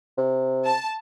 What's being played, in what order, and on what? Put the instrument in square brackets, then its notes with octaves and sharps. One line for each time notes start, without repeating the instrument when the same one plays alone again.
[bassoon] C3
[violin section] A5